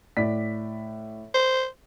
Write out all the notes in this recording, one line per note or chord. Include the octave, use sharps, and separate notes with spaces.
A2 D5 B6
C5